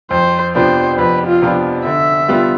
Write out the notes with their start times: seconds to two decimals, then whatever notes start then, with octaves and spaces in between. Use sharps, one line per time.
0.11 F2 C5
0.55 C3 F3 B3 D4 C5
0.98 F2 B4
1.27 F4
1.42 C3 F3 B3 D4
1.85 D3 E5
2.28 G3 B3 F4